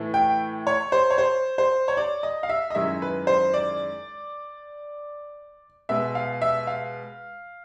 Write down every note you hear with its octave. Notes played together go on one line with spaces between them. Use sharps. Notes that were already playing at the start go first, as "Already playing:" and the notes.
Already playing: A2 E3 A3
G5
C#5
C5
C#5
C5
C5
C#5
D5
D#5
F5
E5
D#5
F#2 D#3 G#3 C#4 E4 E5
B4
C5
D5
B2 G#3 B3 E5
F5
E5
F5